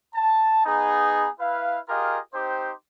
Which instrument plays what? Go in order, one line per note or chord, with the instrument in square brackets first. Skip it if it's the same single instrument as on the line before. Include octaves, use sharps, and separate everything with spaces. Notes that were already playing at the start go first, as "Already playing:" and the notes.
[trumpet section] A5
B3 D#4 G#4
E4 B4 F5
F4 G4 G#4 A#4 D#5 F5
C4 D#4 G4 C5